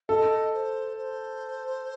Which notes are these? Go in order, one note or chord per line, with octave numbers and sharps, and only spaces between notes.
A4 D#5
C5
C5